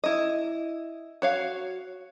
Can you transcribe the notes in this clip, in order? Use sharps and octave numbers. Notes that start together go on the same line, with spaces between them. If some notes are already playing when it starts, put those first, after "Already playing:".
E4 D#5
F#4 C#5 F5